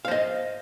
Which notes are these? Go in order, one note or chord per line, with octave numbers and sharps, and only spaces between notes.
C5 D#5 F5